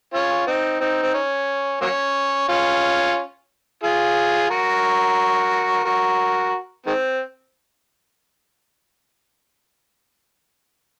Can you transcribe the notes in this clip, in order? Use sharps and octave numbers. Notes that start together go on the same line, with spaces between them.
C#4 F4
C4 D#4
C4 D#4
C4
C#4
F#3 A#3 C#4
C#4 F4
F4 G#4
F#4 A#4
F#4 A#4
D#3 G#3 C4